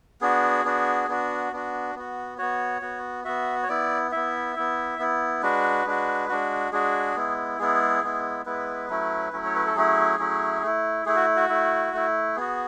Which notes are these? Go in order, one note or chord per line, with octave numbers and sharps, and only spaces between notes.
B3 D4 F#4 G#4
B3 D4 F#4
B3 D4 F#4
B3 D4 F#4
B3 F#4
B3 F#4 C#5
B3 F#4
B3 F#4 E5
C#5
B3 E4 D5
B3 E4 E5
B3 E4
B3 E4
G#3 D4 F#4 B4
G#3 D4 F#4
G#3 D4 F#4
G#3 D4 F#4 G#4
G#3 B3 E4
G#3 B3 E4 G#4
G#3 B3 E4
G#3 B3 E4 B4
F#3 A3 C#4 E4
F#3 A3 C#4 E4
C#5
B4
A4
F#3 A3 C#4 E4 G#4
F#3 A3 C#4 E4
A3 E4
A3 E4 G#4
F#4
F#4
A3 E4
A3 E4
B3 F#4 G#4